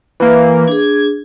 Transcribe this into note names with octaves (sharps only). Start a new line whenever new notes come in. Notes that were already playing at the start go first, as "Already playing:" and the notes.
E3 A#3 B4 E5
D4 G#4 G#6